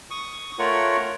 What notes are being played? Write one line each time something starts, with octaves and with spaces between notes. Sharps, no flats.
C#6 D#6
A3 F4 A#4 C#5 F#5